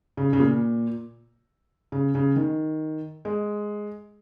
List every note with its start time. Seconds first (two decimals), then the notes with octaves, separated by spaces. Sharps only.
0.17 C#3
0.33 C#3
0.40 A#2
1.92 C#3
2.15 C#3
2.36 D#3
3.25 G#3